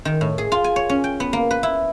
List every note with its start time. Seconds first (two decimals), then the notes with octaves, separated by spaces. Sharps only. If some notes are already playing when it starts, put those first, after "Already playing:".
0.05 D#3
0.21 A2
0.38 G#4
0.52 F4
0.64 G#5
0.76 C#5
0.89 C#4
1.04 G5
1.20 B3
1.33 A#3
1.51 B4
1.63 E4